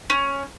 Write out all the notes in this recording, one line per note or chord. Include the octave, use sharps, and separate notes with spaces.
C#4